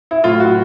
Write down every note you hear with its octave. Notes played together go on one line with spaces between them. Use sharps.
E4
A2 F#3 F4
F#4